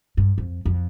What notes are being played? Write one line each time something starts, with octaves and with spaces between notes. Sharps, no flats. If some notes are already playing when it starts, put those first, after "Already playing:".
G2
F2
F2